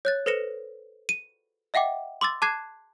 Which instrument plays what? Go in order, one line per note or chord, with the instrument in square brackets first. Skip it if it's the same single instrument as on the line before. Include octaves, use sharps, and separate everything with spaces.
[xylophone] C#5 F#6 A6
A4 B4 C5 A#6 C#7 E7
D#7
D#5 E5 F#5 G5 D6
C6 D6 E6 A6
A5 D6 F#6 G#6 C7 E7